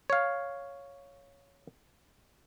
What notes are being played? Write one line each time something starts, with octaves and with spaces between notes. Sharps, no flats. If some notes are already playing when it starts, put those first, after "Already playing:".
C#5 F5